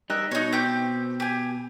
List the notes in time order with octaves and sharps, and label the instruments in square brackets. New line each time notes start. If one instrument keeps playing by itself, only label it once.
[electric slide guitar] G3 D#4 [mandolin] A#4 E5 F#6
[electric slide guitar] B2 [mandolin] D#4 C#5
[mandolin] C4 G4 G6
G4 G#5